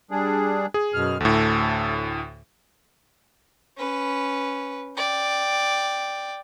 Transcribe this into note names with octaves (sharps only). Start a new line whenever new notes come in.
G3 D4 G#4
G#4
F#2 B2 F6
D2 A2 A4
C#4 B4
D5 G5